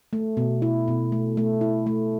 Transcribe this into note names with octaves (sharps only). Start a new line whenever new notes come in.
A3
B2
E4
B2
A3
A3
E4
A3